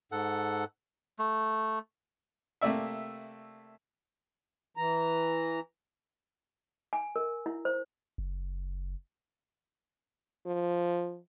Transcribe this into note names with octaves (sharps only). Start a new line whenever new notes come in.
G#2 A4 F#5
A3
C3 A3 A#3 D5 E5
E3 A#5
G#5
A#4
E4
C5
F#1
F3